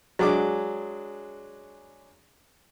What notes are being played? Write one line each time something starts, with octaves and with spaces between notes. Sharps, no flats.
F#3 G#3 D4 G#4 D6